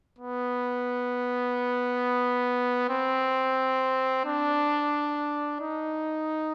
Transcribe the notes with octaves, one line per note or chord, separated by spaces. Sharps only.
B3
C4
D4
D#4